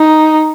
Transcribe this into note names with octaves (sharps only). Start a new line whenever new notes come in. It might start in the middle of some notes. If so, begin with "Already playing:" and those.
Already playing: D#4